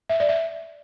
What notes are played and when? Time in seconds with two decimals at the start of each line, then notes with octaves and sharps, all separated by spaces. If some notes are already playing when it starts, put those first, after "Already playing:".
0.09 E5
0.20 D5
0.29 E5